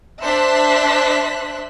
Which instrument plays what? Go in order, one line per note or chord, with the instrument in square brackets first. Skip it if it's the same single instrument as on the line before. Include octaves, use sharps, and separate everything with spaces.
[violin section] D4 C5 E5 C6 F#6 B6